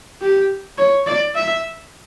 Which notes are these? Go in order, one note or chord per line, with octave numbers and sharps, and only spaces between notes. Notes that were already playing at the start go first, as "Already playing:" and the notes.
G4
C#5
D5
E5